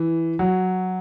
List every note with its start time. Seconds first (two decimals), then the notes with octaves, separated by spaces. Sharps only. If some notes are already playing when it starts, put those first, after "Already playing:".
Already playing: E3
0.39 F#3